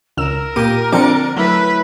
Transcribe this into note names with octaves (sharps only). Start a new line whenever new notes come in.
C#2 A#4 E6 E7
A#2 A#3 G4 D#7
D3 F3 C4 D4 D6 C#7
F#3 A3 E4 B4